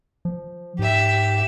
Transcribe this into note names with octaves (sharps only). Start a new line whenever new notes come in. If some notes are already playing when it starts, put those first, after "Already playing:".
F3
G#2 G4 E5